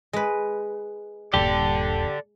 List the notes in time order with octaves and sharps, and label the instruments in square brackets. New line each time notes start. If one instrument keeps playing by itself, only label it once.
[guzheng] G#3 B4
[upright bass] D#1 G2 [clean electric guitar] G4 [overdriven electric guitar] A4 D5